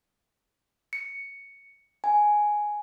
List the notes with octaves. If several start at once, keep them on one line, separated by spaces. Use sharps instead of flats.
C#7
G#5